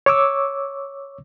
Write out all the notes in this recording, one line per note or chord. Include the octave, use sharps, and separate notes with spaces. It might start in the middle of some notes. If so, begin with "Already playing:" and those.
C#5 C#6 D6 E6